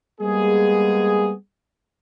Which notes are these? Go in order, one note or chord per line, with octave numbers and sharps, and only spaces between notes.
G3 G#3 A#3 B3 G#4